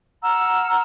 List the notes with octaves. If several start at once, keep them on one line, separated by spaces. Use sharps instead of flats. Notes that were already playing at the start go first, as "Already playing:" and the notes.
F#5 A#5 E6 F6